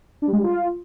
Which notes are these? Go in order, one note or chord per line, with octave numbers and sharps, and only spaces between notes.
D4
G3
G#3
G3
F4